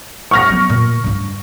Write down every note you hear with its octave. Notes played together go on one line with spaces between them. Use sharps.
C#6 F6 A#6
F#3 B3
A#2
G2 D4